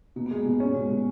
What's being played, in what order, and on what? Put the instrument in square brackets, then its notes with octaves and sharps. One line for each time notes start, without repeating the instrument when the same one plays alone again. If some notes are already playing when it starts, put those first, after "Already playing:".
[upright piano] B2 [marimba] A#3
[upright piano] G#3 [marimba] B3
[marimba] A#3
[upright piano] B2
C#4
[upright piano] B2 [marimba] G#3
[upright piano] B2